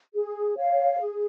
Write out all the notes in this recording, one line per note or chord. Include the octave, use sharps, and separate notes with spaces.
G#4
C#5 F5
G#4